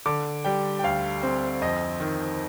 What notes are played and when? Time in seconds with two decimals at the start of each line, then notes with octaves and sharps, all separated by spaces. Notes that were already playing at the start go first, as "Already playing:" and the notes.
0.06 D3 D6
0.44 G3 G5
0.79 G5
0.83 D2 F5
1.23 C4
1.61 F2 D#5
2.00 D#3